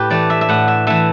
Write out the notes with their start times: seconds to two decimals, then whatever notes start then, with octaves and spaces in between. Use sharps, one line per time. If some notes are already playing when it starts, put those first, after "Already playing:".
Already playing: A2 G4 B4
0.10 E3 A3 D5
0.30 E5
0.41 E5
0.49 A2 F#5
0.68 E5
0.87 E3 A3 E5